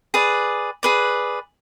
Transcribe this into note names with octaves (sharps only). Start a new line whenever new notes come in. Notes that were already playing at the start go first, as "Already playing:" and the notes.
G#4 B4 D5
G#4 B4 D5